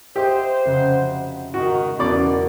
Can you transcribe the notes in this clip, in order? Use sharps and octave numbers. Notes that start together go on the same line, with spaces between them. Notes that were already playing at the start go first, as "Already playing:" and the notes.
G4 C5 D#5 E5 G5
F1 C#3 F#4
G#2 D#3 F#4
G#1 E2 B2 C#4 A#4 D5